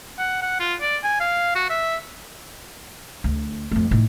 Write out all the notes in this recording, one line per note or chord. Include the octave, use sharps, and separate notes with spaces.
F#5
F#5
F4
D5
G#5
F5
F#4
E5
D2
F2 A3
A2 D#4